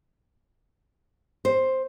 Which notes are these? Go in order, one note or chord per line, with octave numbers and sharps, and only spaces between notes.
C5